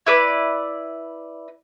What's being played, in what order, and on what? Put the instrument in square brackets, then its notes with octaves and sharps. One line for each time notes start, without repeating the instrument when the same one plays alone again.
[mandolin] E4 B4 D5